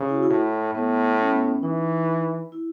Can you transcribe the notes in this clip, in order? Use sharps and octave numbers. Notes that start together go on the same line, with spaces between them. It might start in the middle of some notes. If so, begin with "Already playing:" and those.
Already playing: C#3
E4
F#4
E4
A2
A2 B3
C#4
B3
C#4
E3 D#4
E4